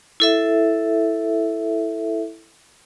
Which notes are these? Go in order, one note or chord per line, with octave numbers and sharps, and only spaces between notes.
E4 A4 E5